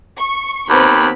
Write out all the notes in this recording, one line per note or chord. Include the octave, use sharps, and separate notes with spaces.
C#6
D#2 B3 C4 B5